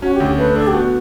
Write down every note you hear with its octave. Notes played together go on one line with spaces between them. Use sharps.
C#4 F#4
G4
D2
A3 B4
D4 A4
G4
B3 F#4